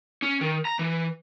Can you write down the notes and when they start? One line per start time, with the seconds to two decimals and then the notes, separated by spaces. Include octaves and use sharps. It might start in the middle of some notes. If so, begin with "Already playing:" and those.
0.22 C#4
0.41 D#3
0.65 A#5
0.79 E3